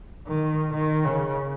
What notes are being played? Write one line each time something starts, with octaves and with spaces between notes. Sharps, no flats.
D#3
D#3
C#3